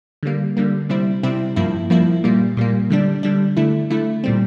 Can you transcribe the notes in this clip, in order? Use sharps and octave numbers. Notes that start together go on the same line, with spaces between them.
D3 G3 A#3
D3 G3 A#3
C3 G3 C4 E4
C3 G3 C4 E4
G2 F3 A#3 E4
G2 F3 A#3 E4
A#2 G3 A#3
A#2 G3 A#3
D3 G3 D4
D3 G3 D4
D3 A3 E4
D3 A3 E4
A#2 G3 C4